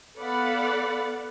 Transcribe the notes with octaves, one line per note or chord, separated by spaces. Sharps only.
B3 A4 D5 F5 F#5 B5